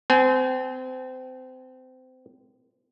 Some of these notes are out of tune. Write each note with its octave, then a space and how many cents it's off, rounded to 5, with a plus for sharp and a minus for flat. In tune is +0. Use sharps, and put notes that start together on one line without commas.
C4 -25 G#5 +30